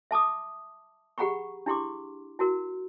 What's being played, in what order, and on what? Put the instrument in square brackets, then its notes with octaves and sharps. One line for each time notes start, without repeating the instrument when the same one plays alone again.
[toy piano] E5 A5 D6 D#6
G4 G#4 F#5 A#5 B5 C#6
D4 E4 G4 C6 D6
E4 F#4 A#4